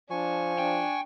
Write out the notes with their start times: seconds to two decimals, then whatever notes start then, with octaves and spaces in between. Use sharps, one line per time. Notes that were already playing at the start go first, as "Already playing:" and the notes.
0.10 F3 D4 G#5 C#6
0.58 D4 G5